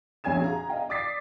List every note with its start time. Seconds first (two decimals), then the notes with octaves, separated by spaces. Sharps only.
0.24 A#1 F2 C#4 G#5 G#6 E7
0.39 F#4 G#4 F5 A#5
0.69 D#5 F5 G5
0.89 D5 D6 D#6 A6 B6 C7